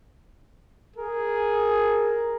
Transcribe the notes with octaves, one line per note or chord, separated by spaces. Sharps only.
G#4 A#4